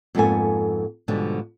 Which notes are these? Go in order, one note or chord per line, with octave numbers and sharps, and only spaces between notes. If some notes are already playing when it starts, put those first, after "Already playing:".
F2 G#2 A#3 B3 A4 G#5
G#2 B2 D3 F3 G3